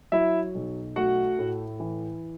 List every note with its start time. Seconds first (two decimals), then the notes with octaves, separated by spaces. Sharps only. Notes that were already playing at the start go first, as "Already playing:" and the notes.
0.12 F#3 E4 E5
0.55 B1
0.96 A3 F#4 F#5
1.39 A2
1.80 E3